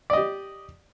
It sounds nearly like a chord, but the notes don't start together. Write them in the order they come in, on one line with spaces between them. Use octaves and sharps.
D5 D#5 G4